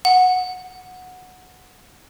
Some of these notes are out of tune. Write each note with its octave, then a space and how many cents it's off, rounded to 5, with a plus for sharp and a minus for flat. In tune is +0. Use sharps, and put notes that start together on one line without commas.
F#5 -10